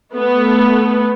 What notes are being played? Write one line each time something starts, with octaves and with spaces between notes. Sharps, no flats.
A3 B3